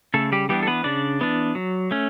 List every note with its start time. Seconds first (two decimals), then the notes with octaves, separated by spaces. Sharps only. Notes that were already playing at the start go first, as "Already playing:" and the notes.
0.14 C#3 A3 A4
0.32 G3 G4
0.49 E3 G3 B3 D4 G4
0.63 A4
0.67 B3 B4
0.84 C#3 D4 D5
1.21 E3 B3 D4
1.55 F#3
1.91 A3 C#4